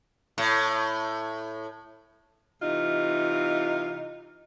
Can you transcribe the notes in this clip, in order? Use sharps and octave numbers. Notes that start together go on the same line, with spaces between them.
A2
C3 E3 D#4 F4